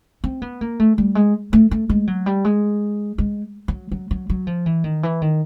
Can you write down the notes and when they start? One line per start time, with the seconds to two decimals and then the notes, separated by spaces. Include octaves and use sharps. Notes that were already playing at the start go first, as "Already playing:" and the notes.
0.24 C4
0.42 B3
0.61 A#3
0.80 A3
0.98 G3
1.15 G#3
1.53 A3
1.71 A3
1.89 G#3
2.07 F#3
2.26 G3
2.45 G#3
3.18 G#3
3.68 F#3
3.92 F#3
4.11 F#3
4.30 F#3
4.47 F3
4.66 E3
4.84 D#3
5.03 E3
5.22 D#3